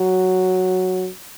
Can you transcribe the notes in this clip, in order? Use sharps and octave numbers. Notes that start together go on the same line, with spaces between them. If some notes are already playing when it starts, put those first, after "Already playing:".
Already playing: F#3